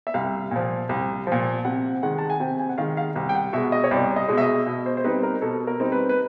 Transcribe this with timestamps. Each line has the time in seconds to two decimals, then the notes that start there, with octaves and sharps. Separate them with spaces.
0.07 E5
0.14 C2 F5
0.51 A#2 F3
0.89 C2
1.27 A#2 F3
1.65 C3 F#5
2.03 D#3 G#3 F#5
2.18 A5
2.30 G#5
2.40 C3 G5
2.59 G#5
2.69 F#5
2.78 D#3 G#3 F5
2.97 F5
3.16 C2
3.29 G5
3.35 F#5
3.53 B2 G#3 E5
3.72 D#5
3.84 C#5
3.91 C2 D5
4.16 D#5
4.28 B2 G#3
4.38 E5
4.41 D#5
4.66 B2 D#5
4.86 C5
4.97 C5
5.04 G3 C4 D#4 B4
5.23 A#4
5.42 B2 A4
5.67 A#4
5.80 G3 C4 D#4
5.92 B4
6.09 B4